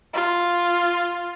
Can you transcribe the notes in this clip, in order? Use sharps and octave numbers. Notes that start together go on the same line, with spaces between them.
F4